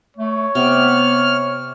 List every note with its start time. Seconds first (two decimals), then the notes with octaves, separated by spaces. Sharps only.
0.17 A3 C#5
0.55 C3 B3 F6